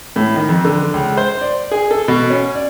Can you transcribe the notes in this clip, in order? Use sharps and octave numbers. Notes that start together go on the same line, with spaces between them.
A2
D#3
F2
D3
C#2
C5
D5
G#4
A4
B2
C#4
D5